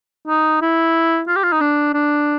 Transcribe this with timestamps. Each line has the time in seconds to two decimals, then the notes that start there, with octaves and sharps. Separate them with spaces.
0.27 D#4
0.62 E4
1.28 F4
1.36 G4
1.43 F4
1.53 D#4
1.61 D4
1.94 D4